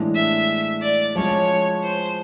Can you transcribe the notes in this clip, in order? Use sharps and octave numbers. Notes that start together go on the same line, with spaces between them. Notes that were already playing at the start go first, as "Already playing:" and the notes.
Already playing: A2 E3 G#3 B3 D4
E5
D5
F3 G#3 C#4 C#5
C5